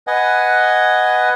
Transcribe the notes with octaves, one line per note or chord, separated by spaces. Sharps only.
B4 D#5 F#5 G#5